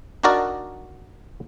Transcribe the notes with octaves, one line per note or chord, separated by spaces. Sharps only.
D4 D#4 F#4 A#4 D5